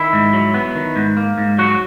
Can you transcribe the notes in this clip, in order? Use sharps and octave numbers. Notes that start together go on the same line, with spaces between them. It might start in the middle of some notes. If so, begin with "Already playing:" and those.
Already playing: D#3 E4
G#2
F#3
B3
D#3
G#2
A#3
G#2
F#3 F#4